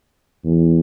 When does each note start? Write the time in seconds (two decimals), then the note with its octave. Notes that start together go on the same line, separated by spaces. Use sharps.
0.45 E2